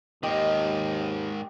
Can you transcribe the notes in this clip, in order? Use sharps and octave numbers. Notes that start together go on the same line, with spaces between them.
D#2 G#2 D#3 G4 D#5